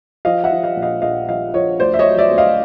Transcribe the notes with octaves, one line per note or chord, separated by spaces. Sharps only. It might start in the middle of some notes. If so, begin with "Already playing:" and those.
F3 D#5 F5
E5 F#5
F3
D#5 F5
A#1
D#5 F5
A#1 D#5 F5
F3 D#5 F5
F3 C#5 D#5
D2 C5 D5
E5
C#5 D#5
F#3
D5 E5
D2
D#5 F5